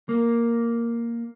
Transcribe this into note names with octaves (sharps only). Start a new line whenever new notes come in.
A#3